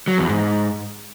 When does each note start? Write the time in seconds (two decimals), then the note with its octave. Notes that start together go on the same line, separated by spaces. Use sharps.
0.08 F#3
0.18 E2
0.29 G#2